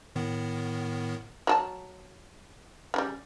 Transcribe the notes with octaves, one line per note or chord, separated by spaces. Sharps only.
A2 D#3 B3
F#3 G#4 A5
C#3 F#3 G3